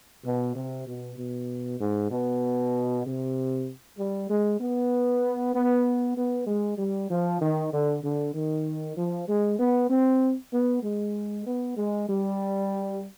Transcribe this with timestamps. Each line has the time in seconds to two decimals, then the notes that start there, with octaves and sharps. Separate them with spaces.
0.25 B2
0.55 C3
0.87 B2
1.17 B2
1.80 G#2
2.11 B2
3.05 C3
3.99 G3
4.29 G#3
4.61 B3
5.54 B3
6.17 B3
6.47 G#3
6.78 G3
7.10 F3
7.41 D#3
7.73 D3
8.03 D3
8.34 D#3
8.97 F3
9.28 G#3
9.59 B3
9.90 C4
10.53 B3
10.83 G#3
11.46 B3
11.77 G#3
12.09 G3